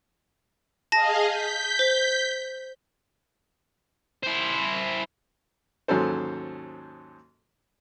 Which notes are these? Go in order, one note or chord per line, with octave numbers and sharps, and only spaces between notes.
G#4 D#5 F5 A5 A#6
G6 B6
C5
E4 C5
D#2 G#2 F#3 C#4 A4 C5